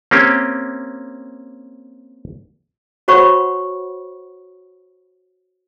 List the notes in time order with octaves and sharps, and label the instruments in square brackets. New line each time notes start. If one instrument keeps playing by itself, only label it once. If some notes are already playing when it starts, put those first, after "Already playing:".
[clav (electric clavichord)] A#3 C4 C#4 G4
[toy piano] F#4 C5 C#5 F#5 B5 C#6